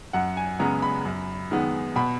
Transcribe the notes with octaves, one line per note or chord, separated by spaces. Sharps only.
F#2 F#5
G#5
C#3 G#3 B3 A#5
B5
F#2
D#3 G#3 B3
B2 B5